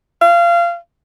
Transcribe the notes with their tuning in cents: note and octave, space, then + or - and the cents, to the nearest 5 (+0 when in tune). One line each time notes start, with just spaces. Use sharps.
F5 -25